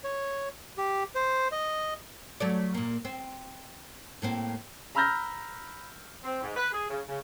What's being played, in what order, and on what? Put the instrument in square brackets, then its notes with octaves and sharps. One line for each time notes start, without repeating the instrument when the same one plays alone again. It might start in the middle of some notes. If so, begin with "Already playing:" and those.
[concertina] C#5
G4
C5
D#5
[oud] F#3 A3 D5
A#2 A#3
C4
A2 A#3 C4
[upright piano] A#5 B5 E6 F6 G6 A#6
[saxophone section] C4
G#2
B4
G#4
C#3
C#3